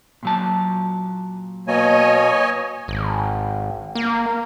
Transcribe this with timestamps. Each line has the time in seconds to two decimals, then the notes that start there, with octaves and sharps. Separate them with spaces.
0.23 A#2 F#3 A5
1.68 B2 A#3 C#5 D#5 G#5
2.88 G#1
3.95 A#3